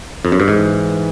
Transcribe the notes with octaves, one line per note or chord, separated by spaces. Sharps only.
F2
F#2
G2
G#2 E3